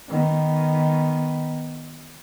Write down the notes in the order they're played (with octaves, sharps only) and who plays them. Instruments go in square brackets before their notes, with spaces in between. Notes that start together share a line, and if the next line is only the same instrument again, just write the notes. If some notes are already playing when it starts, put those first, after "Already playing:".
[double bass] D#3 B3